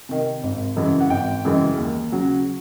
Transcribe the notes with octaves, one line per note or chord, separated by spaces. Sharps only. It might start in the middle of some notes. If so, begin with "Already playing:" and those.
C3 D#3
G#1
F#2 C#3 E3 G#3
F#5
G#1 G5
F#2 C#3 E3 G#3
D#2
C#3 F#3